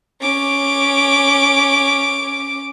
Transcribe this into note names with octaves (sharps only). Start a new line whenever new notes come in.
C#4 D6